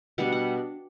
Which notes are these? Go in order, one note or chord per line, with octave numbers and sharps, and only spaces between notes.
B2 G3 B3 D4 F#5
F#5